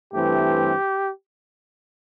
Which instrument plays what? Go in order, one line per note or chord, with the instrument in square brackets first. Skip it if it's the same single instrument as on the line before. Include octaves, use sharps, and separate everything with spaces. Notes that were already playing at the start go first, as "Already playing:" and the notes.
[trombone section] G2 E3 A3 C4 G4